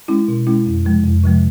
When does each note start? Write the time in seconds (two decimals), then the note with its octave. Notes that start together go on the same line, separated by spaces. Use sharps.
0.08 G#3 C#4 E4
0.28 B2
0.47 G#3 C#4 E4
0.66 F2
0.85 C3 F3 G#3
1.04 F2
1.23 C3 F3 G#3